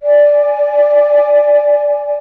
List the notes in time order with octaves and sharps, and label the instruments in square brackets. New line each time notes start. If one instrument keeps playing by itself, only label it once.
[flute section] D5 G#5